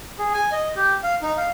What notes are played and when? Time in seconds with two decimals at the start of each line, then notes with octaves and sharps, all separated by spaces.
0.19 G#4
0.34 G#5
0.52 D#5
0.76 G4
1.04 F5
1.22 D#4
1.37 F5